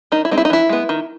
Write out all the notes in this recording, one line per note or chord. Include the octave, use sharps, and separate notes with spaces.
D#3 D#4
E4
G#3 C4 D#4
E4
D#4
E3 E4
G#3 B3
D#3